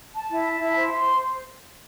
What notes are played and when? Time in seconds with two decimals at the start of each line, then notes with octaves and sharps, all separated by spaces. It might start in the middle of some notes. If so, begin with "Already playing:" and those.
0.16 A5
0.30 E4
0.45 A5
0.61 E4
0.76 C5
0.91 C6
1.06 C5